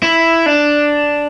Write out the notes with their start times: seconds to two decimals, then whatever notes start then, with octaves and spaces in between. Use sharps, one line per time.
0.03 E4
0.46 D4